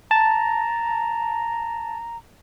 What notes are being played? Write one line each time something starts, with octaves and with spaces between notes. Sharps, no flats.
A5 A#5